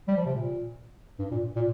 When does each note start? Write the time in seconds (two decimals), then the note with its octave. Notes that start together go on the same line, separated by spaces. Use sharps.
0.08 G3
0.17 F3
0.25 C3
0.35 A#2
1.19 G2
1.31 A#2
1.56 A#2